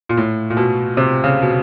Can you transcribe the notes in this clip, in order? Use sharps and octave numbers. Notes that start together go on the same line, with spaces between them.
A#2
A2
A#2
B2
C3
C#3
B2